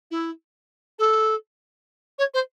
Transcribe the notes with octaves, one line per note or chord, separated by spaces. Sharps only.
E4
A4
C#5
C5